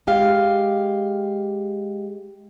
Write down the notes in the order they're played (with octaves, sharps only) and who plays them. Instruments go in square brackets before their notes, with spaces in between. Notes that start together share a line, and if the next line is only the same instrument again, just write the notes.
[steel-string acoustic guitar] G#3 G4 F5